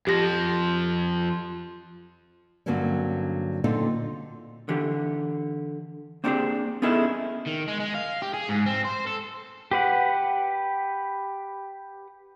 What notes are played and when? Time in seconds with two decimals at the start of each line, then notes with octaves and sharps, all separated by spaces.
0.07 F2 F3 G4 A#6
2.66 G2 D3 F#3 A#3 C4 C#4
3.64 A#2 D3 C4 D#4 F4 A4
4.69 D3 E3 G4
6.24 A#3 C4 D4 D#4 G4 G#4
6.82 B3 C#4 D#4 E4 G#4 A4
7.46 D#3
7.68 G#3
7.80 G#3
7.95 F5
8.22 G4
8.34 G#4
8.49 G#2
8.66 C4
8.84 C5
9.07 A4
9.71 G4 B4 F#5